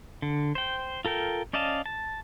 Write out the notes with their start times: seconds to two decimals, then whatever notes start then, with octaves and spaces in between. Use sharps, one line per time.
0.22 D3
0.55 C5 G5
1.05 F4 A4 A#4 G5
1.53 C#4 D5 D#5 F5 A5
1.86 A5